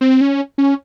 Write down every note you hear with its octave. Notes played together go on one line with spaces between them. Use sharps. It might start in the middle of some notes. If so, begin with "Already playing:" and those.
C4
C#4
C#4